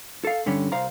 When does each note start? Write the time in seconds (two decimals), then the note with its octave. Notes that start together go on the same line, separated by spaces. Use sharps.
0.25 A4 F5
0.46 G2 D3 G3 C#4
0.72 C2 C5 F5 A#5